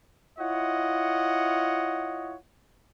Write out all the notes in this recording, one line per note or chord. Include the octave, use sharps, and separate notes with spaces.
E4 F4 C#5 D#5 F#5